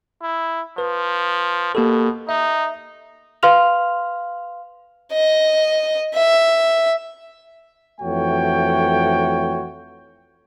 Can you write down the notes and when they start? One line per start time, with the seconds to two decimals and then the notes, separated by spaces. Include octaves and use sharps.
0.22 E4
0.78 F3 B4
1.75 B2 A#3 G4 A4
2.29 D#4 E5
3.43 B4 F5 C6 F6 F7
5.12 D#5
6.15 E5
8.01 F2 E3 A3 F#4 C#5 G5